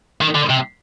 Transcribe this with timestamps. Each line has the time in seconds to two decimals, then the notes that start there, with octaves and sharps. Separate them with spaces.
0.21 D#3
0.35 D3
0.49 C3